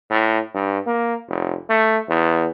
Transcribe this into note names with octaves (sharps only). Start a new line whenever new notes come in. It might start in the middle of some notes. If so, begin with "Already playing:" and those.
A2
G2
A#3
F1
A3
E2